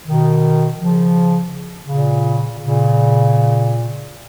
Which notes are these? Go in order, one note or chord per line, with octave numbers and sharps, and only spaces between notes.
B2 D#3
C#3 F3
A#2 C#3
A#2 C#3